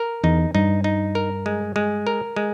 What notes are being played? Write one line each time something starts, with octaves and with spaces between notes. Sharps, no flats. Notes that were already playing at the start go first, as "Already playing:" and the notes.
Already playing: A#4
E2 D#4
G2 D#4
D#4
A#4
G#3
G#3
A#4
G#3